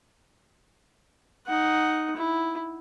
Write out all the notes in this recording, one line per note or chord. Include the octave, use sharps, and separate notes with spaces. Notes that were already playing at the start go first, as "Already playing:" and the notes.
D#4 F#5
E4